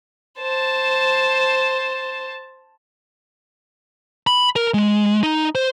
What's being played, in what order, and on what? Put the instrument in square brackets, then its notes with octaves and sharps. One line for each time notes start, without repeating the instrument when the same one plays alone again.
[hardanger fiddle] C5 A5
[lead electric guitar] B5
A#4
G#3
D#4
C5